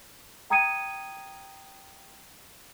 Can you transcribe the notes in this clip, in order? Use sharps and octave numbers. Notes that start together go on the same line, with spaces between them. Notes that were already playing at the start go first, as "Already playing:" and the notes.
G5 A#5 D#6 G#6 C#7 D#7